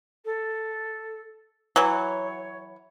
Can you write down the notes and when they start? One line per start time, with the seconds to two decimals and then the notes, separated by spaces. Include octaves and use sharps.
0.25 A4
1.76 E3 F#3 C#5